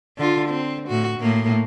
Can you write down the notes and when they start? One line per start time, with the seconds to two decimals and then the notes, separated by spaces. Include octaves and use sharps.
0.18 D3 F4
0.49 C4
0.88 A2 F#4
1.19 A2 A#3